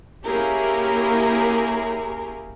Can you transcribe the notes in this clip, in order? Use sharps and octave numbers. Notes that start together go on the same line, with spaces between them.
A#3 C#4 E4 G4 G#4 A#4